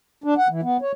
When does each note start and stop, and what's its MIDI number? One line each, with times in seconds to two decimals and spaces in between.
0.24 0.34 62
0.38 0.48 78
0.49 0.61 52
0.63 0.77 59
0.82 0.92 73